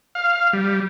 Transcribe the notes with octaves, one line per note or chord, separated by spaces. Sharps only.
F5
G3